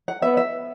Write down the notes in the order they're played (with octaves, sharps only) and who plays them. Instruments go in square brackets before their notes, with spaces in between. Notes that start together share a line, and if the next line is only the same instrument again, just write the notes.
[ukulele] F#5
[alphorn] B3 [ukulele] E5
[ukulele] E5